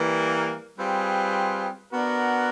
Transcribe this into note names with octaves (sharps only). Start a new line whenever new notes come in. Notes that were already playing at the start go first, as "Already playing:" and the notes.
Already playing: E3 G3 A#3
G3 C4 F4 G#4 B4
B3 D4 F#4 A#4